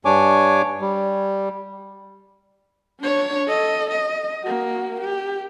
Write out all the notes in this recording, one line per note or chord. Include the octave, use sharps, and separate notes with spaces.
G2 D4 C#5 G#5 D6
G3
D4 C#5
A4 D#5
D#5
A#3 F#4
G4